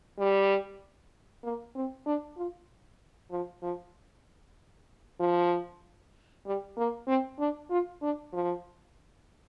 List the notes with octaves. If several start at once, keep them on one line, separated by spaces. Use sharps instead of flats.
G3
A#3
C4
D4
F4
F3
F3
F3
G3
A#3
C4
D4
F4
D4
F3